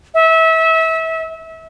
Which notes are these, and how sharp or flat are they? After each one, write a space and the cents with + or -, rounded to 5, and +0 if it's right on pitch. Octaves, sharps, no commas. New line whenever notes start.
E5 -25